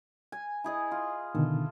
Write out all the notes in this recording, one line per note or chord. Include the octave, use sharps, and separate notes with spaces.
G#5
E4 G#4 D#5
F4
B2 D3 D#3 A4